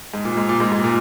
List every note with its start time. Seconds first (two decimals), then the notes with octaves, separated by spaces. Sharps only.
0.14 G#2
0.25 A#2
0.37 G#2
0.49 A#2
0.60 G#2
0.72 G#2
0.84 A#2